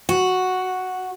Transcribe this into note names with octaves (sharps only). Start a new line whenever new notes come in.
F#4